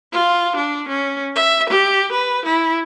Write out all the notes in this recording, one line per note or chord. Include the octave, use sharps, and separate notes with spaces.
F4
D4
C#4
E5
G4
B4
E4